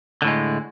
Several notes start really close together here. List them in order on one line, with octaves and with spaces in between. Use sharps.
D3 A2 G#3